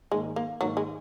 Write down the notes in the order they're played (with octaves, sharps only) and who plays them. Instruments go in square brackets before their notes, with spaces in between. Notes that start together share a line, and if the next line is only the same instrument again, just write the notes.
[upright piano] G#2 D#3 A#3 D#4 [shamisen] G#3
[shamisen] A#3
[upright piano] G#2 D#3 A#3 D#4 [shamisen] F#3
[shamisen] G#3